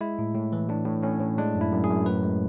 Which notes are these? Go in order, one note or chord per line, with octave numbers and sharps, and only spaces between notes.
G#3 E4
A2
A2
E3
A2 D4
A2
A2 C#4
A2
G#3 D4
F#2
E4
F#2
G#4
F#2
A2 B4
G#3